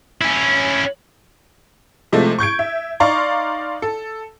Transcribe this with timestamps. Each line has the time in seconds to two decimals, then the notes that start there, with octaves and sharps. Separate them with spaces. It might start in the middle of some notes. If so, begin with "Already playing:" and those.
0.21 C#4 E4
2.12 C3 F3 G#3 A3
2.39 C#6 G6 G#6 D7
2.59 E5
3.00 D#4 D5 F5 A#5 C6 C#6
3.82 A4